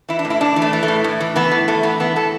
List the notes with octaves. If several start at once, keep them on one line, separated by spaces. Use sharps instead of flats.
E3 E4
D4
A2
E4
A2 D4
E3
A3
E3
A3
A2
A2
E3
E3 B3
A2
A2 A3
E3 B3
E3 B3
A2 A4